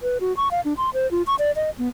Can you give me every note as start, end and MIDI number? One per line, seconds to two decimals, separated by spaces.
0.03 0.18 71
0.20 0.35 66
0.37 0.48 85
0.51 0.61 77
0.65 0.74 62
0.77 0.90 84
0.94 1.09 72
1.11 1.22 65
1.27 1.35 85
1.39 1.51 74
1.56 1.70 75
1.78 1.88 59